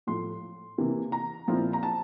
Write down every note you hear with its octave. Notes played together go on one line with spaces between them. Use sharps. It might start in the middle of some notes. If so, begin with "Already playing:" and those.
A2 F3 A3 C6
C3 E3 A#3
A#5
A#2 F3 C4 E4
A#5
A5